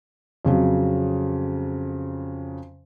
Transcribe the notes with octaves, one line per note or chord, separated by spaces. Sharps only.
F2 C#3 F#3